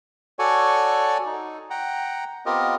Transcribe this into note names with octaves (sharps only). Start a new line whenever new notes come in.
F#4 A4 C#5 D5 G#5 C#6
D#4
F#5 G5 A#5
B3 C4 F4 G4 A#4 D#5